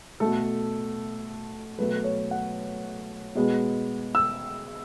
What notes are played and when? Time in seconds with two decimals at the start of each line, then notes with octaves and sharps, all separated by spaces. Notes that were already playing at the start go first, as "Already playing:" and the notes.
0.20 B2 A3 A4
1.79 B2 F#3 A3 B4
2.04 C#5
2.31 F#5
3.35 B2 G#3 B3
4.15 E6